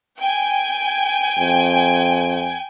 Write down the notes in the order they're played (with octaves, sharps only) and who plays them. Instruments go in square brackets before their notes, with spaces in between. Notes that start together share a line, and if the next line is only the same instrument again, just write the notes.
[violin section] G5 G#5
[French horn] F2